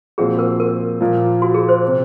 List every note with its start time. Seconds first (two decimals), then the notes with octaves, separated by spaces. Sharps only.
0.18 A#2 F3 C4 F#4 G#4 C5
0.39 A#4
0.60 A#4
1.00 A#2 F3 A#3
1.42 F#4
1.54 G#4
1.69 C5
1.87 C3